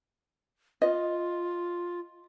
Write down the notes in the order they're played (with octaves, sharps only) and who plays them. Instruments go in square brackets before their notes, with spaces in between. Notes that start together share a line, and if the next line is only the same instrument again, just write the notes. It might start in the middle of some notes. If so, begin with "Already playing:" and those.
[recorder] F4 [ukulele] D#5